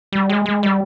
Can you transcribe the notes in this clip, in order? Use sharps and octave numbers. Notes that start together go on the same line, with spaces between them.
G3
G#3
G#3
G3